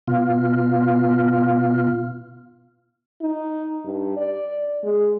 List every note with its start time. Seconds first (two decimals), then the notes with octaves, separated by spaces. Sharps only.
0.08 B2 F4
3.22 D#4
3.85 G2
4.17 D5
4.84 G#3